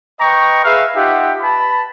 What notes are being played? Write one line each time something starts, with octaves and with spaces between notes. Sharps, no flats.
B4 D#5 G5 A#5 C#6
G#4 B4 E5 F5
D#4 F4 G4 E5 F#5
B4 A5 B5